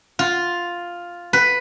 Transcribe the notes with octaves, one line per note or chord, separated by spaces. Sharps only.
F4
B4